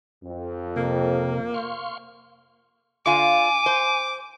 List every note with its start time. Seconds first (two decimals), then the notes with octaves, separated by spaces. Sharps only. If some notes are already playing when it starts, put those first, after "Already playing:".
0.23 F2
0.76 C3 A#3 A#4
1.54 F5 C6 C#6
3.06 D3 F4 F5 G#5 D6
3.66 C5